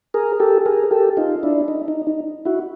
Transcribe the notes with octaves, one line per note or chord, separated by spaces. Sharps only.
G#4 A#4
G4 A4
G#4 A#4
G4 A4
D#4 F4
D4 E4
D#4
D#4
D#4
E4 F#4